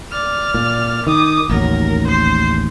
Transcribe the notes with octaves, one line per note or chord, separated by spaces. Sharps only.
D5 F6
A#2
D#3 D6 D#6
A1 D#2 F#3 A#4
C5 C7